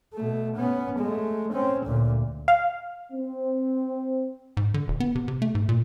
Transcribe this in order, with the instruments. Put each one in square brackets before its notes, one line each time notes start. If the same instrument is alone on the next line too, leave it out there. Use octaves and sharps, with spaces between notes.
[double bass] B2 A3
B3 C#4
G#3 A3
C4 C#4
D2 A#2
[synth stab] F5
[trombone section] C4
[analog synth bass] G#2
D3
D#1
B3
C3
C3
A3
G#2
A#2